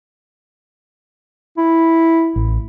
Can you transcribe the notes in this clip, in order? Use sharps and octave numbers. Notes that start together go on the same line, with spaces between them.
E4
A1